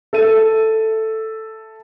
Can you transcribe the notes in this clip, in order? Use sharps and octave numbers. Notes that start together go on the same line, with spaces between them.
A4 E5 D#7